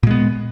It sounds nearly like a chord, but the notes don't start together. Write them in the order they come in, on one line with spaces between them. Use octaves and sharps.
A#2 G#3 B3